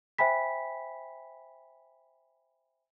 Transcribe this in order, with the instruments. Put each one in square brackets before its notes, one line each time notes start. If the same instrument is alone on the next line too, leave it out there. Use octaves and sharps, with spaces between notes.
[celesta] C5 E5 G5 G#5 B5 B6